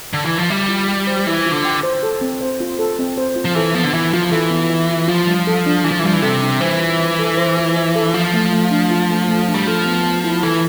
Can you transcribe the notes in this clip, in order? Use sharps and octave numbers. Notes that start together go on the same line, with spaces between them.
D3
E3
F3
G3 E5
F4
G5
C5
E3 E5
F4
D3
G5
C5
A4
C4
C5
F4
A4
C4
C5
F4
F3
E3 A4
F3 B3
D3
E3 E5
F3 F4
E3 A4
B3
E5
F4
F3 F4
G3
A4
D4
E3 F4
F3
E3
F3 G3
E3
C3 A4
D4
E3 C5
F4
E5
A4
C5
F4
E5
A4
F3 F4
A3
A3
D4
F4
A3
A3
D4
G3
F3 A4
B3
B3
E4
E3 A4